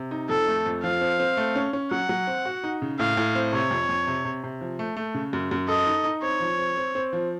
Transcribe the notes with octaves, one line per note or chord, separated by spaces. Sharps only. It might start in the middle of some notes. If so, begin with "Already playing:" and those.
Already playing: C3
D#4
F2 A4
A3
F2
F3 F5
C4
C4
A3
C#4
C#4
F#3 F#5
F#3
C4
F#4
D#4
C#3
A2 F5
A2
C4
C3 C#5
F2
F2
C3
C3
C3
F3
A3
A3
C#3
F#2
F#2
A4 D#5
D#4
D#4
C4 C#5
F3
C4
C4
C4
F3